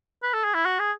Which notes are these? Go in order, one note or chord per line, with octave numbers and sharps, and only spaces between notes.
B4
A4
G#4
E4
F#4
G#4